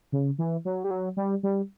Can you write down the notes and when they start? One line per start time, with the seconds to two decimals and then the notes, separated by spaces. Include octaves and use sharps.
0.12 C#3
0.38 E3
0.65 F#3
0.84 G3
0.91 F#3
1.17 G3
1.43 G3